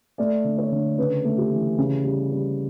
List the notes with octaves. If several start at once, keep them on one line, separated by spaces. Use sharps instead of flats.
A3 D5
D3
C#5
D3
C#3 B4
A3
G4
E3
C#3
G3
G3